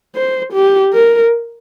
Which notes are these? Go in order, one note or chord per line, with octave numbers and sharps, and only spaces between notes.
C5
G4
A#4